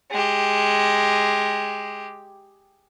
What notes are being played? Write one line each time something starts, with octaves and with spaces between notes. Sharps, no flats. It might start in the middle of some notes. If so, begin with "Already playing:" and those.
G#3 G4